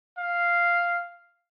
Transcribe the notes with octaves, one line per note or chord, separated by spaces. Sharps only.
F5